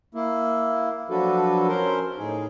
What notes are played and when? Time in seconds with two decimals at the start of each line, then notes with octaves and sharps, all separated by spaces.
0.14 A#3 E4
1.10 F3 F#3 D4 F#4 A4 B4
1.68 C#4 A#4 C5
2.18 A2 D#4 G#4